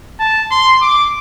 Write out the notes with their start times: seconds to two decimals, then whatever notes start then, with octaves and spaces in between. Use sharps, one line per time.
0.20 A5
0.51 C6
0.82 D6